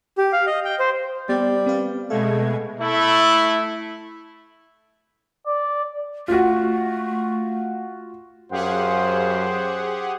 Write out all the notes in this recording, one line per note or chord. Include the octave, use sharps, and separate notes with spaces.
G4
F5
D#5
G5
C5
G3 B3 C5
C4 B4 F5
B2 G#3 A3 F5 G#6
A3 E4
D5
A3 F4 F#4
F#2 G4 G#4 C5 F5 F#5